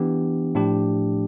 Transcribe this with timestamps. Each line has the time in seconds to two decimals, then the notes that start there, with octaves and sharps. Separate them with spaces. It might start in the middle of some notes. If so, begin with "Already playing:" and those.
Already playing: E3 B3 D4 G4
0.55 A2 F3 A3 D4 G4